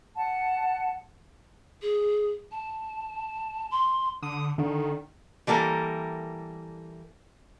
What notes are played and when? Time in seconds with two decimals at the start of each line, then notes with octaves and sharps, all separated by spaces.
0.16 F#5 A5
1.82 G#4
2.51 A5
3.71 C6
4.22 D3 D#6
4.58 D3 D#3
5.47 E3 G3 A#3 A4 A#4